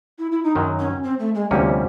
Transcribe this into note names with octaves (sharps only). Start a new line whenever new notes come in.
E4
E4
D#4
F#2 D#3 F#3
C#4
C4
A3
G#3
D2 C3 F3 G3 A#3 C#4